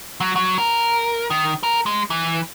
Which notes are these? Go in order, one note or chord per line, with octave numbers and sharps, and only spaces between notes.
F#3
F#3
A#4
D#3
A#4
G#3
E3